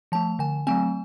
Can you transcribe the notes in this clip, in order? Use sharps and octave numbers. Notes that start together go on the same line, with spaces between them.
F3 A3 A5
D3 G#5
F#3 A3 C4 G#5